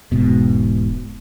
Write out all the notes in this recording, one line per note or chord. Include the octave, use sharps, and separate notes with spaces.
E1 G#2 B2